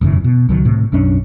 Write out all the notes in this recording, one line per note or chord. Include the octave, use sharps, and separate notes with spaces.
E1 F#2 C#3 E3
B2
C#2 D#3 F#3
A2 C3
B1 F#2 C#4 D4